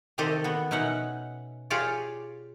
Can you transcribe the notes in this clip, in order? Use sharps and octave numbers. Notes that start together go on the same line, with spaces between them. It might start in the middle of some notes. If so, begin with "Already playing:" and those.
C3 D#3 C4 G4 A4 D#5
B3 F#4
B2 C#4 D#4 E5 F#5
F4 G4 G#4 C#5 D5